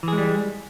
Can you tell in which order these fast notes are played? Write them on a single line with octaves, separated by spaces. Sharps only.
E3 G#4 G#3 G3